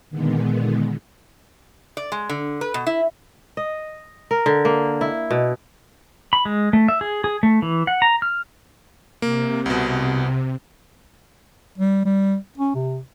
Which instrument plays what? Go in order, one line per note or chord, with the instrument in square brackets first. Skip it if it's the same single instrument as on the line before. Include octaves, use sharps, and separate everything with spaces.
[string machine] A#2 D3 D#3 G#3 B3
[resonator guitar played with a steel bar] D5
G#3
D3
B4
B2
E4
[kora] D#5
A#4
D3
A#3
E4
B2
[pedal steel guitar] B5
G#3
A3
E5
G#4
G#4
A3
E3
F#5
A#5
F6
[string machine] C3 [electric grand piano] A#3
[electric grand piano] C2 B2
[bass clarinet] G3
G3
C#4
C3